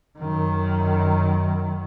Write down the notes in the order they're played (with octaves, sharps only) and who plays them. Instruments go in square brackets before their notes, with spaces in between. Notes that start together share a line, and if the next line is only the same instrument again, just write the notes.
[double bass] F#2 D#3